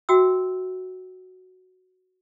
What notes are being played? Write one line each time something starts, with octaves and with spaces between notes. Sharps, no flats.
F#4 E5 G5 E6